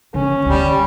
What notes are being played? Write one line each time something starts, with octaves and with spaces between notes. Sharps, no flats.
C#3 C#4
D2 G3 A3